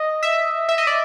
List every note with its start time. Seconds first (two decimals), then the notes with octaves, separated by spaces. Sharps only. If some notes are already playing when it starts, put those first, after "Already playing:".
Already playing: D#5
0.23 E5
0.69 E5
0.78 D#5
0.87 D5